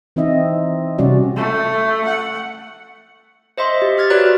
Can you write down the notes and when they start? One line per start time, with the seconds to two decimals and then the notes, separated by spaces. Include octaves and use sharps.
0.16 E3 C4 D#4 D#5 E5
0.98 C3 G3 C#4 F#4 D5
1.37 A3
2.05 F#5
3.58 C5 D#5 E5 C6
3.82 G4
3.98 E5 F6 G#6 A6
4.10 F#4 B4 C#5 D5 A#5 F#6